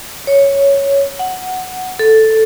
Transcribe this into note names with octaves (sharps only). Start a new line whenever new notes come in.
C#5
F#5
A4